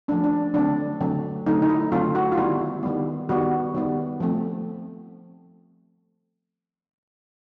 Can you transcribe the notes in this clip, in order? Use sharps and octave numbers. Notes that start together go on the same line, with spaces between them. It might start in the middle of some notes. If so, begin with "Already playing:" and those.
F3 A3 C#4 D4
D4
D3 F#3 A3 C4 D4
D3 F#3 A3 C4
D3 F#3 A3 C4 D#4
D#4
E4
D3 F#3 A3 C4 F4
F#4
F4
D#3 G3 B3 E4
D#3 G3 B3
D#3 G3 B3 F#4
D#3 G3 B3
F3 A3 C4